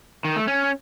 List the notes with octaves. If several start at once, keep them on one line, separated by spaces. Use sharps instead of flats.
D#3
A3
C#4